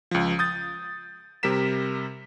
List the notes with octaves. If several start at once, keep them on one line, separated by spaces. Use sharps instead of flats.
C#2 F3
D#6 G6 A6
C3 G3 A#4 B6 E7